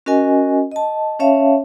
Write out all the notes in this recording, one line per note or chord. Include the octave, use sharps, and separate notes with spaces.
C#4 F#4 A#4 D#5 G#5
D#5 A5
C#4 C#5 E5 F5 A5